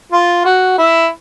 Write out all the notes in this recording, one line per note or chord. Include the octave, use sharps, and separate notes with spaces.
F4
F#4
E4